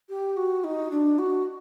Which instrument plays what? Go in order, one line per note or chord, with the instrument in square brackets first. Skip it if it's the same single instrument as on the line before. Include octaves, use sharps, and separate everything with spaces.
[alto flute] G4
F#4
D#4
D4
F#4